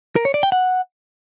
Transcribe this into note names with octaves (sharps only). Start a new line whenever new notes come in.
A#4
C#5
D5
G5
F#5